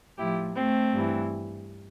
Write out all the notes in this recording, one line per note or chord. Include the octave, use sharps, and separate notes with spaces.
A2 F3 E4 G4
A3 C4
G2 E3